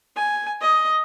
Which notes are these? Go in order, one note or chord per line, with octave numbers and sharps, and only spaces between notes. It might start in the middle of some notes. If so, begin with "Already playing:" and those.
G#5
D#5